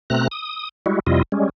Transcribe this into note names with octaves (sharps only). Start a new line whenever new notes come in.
B2 A3 C4 A#5 F#6
D#6
G3 G#3 E4 F#4
F2 C3 G3 E4 F4 D#5
G3 G#3 C#4